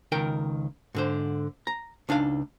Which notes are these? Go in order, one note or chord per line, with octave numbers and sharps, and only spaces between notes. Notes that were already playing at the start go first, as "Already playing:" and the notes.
C#2 D#3 A#4 G5
G#2 D3 C5
A#5
C#2 D4 D#4 F5